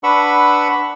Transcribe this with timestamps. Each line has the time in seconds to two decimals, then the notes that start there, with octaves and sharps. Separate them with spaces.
0.04 D4 B4 F#5 B5 C#6 E6